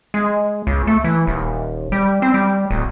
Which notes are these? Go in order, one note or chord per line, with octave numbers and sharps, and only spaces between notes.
G#3
C#2
A3
E3
D#1
G3
C4
G3
D1